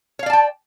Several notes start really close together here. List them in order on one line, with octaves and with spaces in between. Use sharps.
C#5 F5 D5 A5 G5